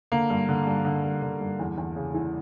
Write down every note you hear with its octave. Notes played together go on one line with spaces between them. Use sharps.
D3 A#3
G2
D3
G2
D3
G2
D3
G2
E2
E2
C#3
E3